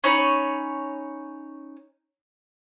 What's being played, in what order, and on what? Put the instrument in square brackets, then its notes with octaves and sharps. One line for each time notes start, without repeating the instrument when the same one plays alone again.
[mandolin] C#4 D#4 C#5 B5